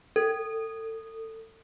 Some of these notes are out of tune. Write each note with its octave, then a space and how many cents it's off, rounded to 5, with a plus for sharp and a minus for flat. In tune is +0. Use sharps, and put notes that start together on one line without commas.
A4 +30